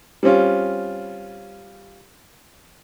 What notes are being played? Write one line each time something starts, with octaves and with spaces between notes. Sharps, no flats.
G3 C4 C#4 F4